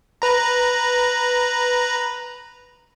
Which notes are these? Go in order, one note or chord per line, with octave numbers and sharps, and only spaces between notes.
B4 A#5